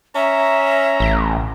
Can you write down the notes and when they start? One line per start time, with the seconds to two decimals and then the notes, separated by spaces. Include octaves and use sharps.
0.15 C#4 E5 A#5
1.00 A1